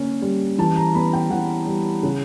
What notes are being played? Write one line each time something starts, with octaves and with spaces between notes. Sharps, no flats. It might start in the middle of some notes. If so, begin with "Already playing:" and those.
Already playing: D3 A#3 C#4
G3
E3 A5
A#5
B3 B5
G5
E3 F#5
G3
C#3